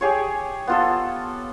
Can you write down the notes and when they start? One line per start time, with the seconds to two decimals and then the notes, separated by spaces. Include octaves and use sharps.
0.01 G4 G#4 C#5
0.67 B3 F4 A4